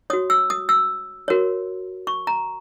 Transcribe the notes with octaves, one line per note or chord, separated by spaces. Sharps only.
F#4 C#5 D#6
E6
D#6
E6
F#4 A#4 C#5
C#6
A#5